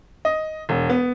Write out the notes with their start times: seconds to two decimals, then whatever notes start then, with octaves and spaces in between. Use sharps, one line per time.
0.25 D#5
0.69 E1
0.90 B3